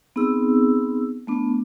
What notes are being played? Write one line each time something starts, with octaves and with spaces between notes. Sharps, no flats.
B3 C4 D#4 G#4 E6
A3 B3 D4